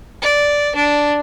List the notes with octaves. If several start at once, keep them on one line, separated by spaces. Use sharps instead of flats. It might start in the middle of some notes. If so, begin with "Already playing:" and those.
D5
D4